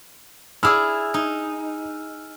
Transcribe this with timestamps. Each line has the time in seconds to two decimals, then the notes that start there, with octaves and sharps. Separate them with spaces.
0.63 E4 G#4 D5 E6 F6
1.14 D#4